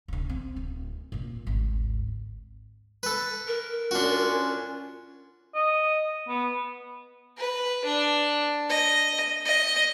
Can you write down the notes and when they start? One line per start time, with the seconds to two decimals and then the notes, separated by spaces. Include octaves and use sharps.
0.08 D1 D3
0.29 C4
0.56 D1
1.12 A#2 A#3
1.47 G#1 D2
3.03 A4 B4
3.47 A#4
3.91 C#4 D4 F4 F#4
5.55 D#5
6.28 B3
7.38 B4
7.85 D4
8.70 D#5
9.46 D#5